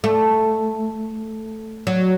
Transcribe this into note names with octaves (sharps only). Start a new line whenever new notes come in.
A3
F#3